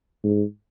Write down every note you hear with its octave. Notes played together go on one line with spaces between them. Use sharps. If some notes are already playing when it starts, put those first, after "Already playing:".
G#2